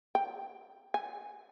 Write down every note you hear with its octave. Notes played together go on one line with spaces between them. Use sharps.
G5
G#5